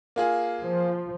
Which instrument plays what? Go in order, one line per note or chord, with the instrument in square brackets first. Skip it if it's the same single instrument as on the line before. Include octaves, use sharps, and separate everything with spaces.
[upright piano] A#3 F4 G#4
[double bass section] F3